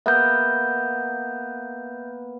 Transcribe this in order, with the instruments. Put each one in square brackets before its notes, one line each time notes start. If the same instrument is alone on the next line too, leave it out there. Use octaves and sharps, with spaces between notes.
[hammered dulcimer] A#3 B3 [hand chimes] E5 G6